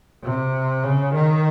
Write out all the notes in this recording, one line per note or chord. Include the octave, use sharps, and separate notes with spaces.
C3
C#3
D#3